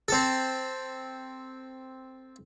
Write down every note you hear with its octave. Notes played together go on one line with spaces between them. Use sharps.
C4 A4